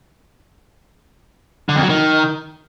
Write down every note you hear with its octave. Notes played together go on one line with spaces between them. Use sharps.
D3
F2
F#3
D#3